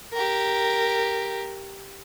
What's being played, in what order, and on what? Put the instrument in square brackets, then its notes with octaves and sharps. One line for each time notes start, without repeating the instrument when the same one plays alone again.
[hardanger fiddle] G4 A#4